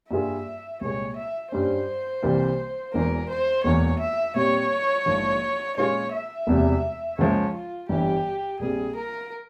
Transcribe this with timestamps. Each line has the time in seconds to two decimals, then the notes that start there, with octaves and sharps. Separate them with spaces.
0.10 G2 G3 A#3 F4 G#4 E5
0.81 C2 A#2 G#3 C#5
1.16 E5
1.52 G2 G3 C#4 C5
2.23 C2 C3 E3 G3 A#3
2.93 E1 E2 E3 A#4
3.29 C5
3.64 E1 E2 E3 A#3 C#5
3.99 E5
4.35 A#2 G3 C4 C#5
5.06 A#1 G#2 F3 A#3
5.77 A#2 G#3 C#4 F4 G#4 C#5
6.12 E5
6.47 E1 E2 C3 G3
7.18 C#2 C#3 F3 G#3 C#5
7.53 F4
7.88 G1 G2 E3 G4
8.59 A#1 A#2 G3 C4 G#4
8.96 A#4